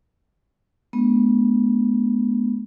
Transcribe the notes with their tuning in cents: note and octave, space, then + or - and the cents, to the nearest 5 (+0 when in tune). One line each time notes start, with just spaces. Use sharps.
G#3 +35 B3 -20 D4 -10